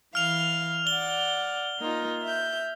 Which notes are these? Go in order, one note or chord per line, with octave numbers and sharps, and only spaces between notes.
E3 F5 F6 F7
D5 F#5 G7
A#3 D#4 F4
E5 G6